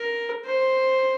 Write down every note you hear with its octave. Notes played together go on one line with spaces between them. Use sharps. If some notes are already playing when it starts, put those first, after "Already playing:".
Already playing: A#4
C5